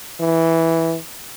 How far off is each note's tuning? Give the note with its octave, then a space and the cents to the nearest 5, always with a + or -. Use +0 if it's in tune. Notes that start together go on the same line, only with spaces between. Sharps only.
E3 -5